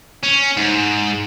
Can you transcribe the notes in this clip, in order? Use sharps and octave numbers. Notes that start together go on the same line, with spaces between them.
C#4
G#2